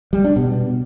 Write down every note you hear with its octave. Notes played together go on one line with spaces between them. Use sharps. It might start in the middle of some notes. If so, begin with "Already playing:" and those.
G3
D4
B2